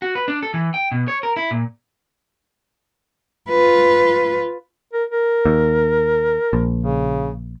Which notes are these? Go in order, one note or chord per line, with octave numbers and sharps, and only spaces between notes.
F#4
B4
D4
A4
E3
G5
B2
C#5
A#4
E4
A#2
F4 B4
A#4
A#4
D#2
A#1
C#3